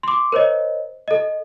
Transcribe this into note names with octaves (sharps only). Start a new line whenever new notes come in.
C6 D6
A#4 C5 C#5 D#5
A4 D#5